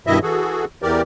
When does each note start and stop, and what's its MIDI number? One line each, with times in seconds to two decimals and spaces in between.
0.07 0.19 43
0.07 0.19 47
0.07 0.19 51
0.07 0.19 64
0.07 0.19 75
0.07 0.19 76
0.23 0.65 52
0.23 0.65 66
0.23 0.65 68
0.23 0.65 69
0.83 1.02 40
0.83 1.02 52
0.83 1.02 67
0.83 1.02 70
0.83 1.02 74